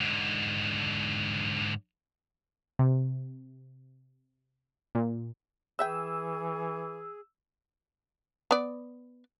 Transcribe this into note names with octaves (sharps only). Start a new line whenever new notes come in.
G#2 D3
C3
A#2
E3 G#4 B4 E5 G5 E6
B3 D5